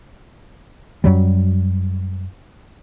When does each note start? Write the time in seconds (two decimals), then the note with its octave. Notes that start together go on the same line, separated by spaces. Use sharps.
1.04 F#2 F#3 G3